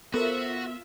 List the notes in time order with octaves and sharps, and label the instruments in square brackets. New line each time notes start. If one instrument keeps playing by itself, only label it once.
[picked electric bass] B3 [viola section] F4 E5 [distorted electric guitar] F#4 [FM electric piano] A4 A#4 C5